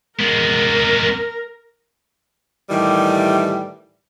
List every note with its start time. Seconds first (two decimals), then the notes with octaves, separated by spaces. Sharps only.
0.19 G#3 B3 A#4
2.70 A2 D#3 E3 G3